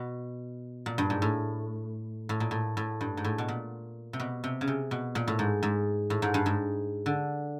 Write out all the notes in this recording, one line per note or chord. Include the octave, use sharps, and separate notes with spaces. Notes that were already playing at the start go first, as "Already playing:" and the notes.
Already playing: B2
A#2
G2
G#2
A2
A2
A#2
A2
A2
G2
G#2
A2
B2
A#2
C3
B2
C3
C#3
C3
B2
A#2
A2
G#2
G#2
A2
G#2
G2
G#2
D3